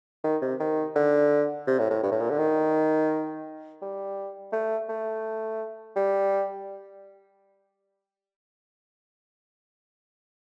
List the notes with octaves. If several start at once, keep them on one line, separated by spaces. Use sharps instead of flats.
D#3
C3
D#3
D3
C3
A2
A2
G2
A2
A#2
D3
D#3
G3
A3
A3
G3